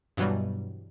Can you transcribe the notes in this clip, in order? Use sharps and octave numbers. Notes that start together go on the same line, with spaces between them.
G2 B2 E3 F#3 G3